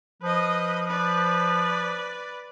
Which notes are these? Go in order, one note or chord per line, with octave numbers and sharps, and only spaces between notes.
F3 B4 D#5
B4 D5